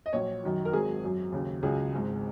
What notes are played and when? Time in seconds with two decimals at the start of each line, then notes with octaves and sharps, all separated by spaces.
0.06 D#5
0.13 A#1 A#2 F#3 C#5
0.44 F#2 D#3 F#3
0.65 A#4
0.73 G#1 G#2 F#3 G#4
1.03 F#2 F#3
1.32 D#2 C#3 F#3
1.62 C#2 C#3 F#3 G#4
1.93 G#1 G#2 G#3